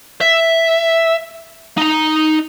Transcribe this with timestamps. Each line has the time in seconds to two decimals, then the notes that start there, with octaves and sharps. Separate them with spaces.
0.21 E5
1.78 D#4 A#5